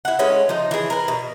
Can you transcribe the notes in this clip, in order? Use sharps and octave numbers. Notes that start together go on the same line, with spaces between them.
E4 F#5
G#3 A3 C#4 B4
F3 D#4
E3 G#4
A#4 B4
B2